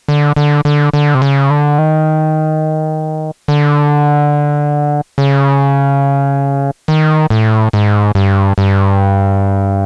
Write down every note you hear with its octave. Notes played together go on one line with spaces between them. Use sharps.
D3
D3
D3
D3
C3
C#3
D3
D#3
D3
C#3
D#3
A2
G#2
G2
G2